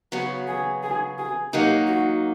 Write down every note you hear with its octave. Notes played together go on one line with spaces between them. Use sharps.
C#3 F#3 B3 F#4
G#4
G#4
G#4
F#3 A#3 D#4 G4
F#4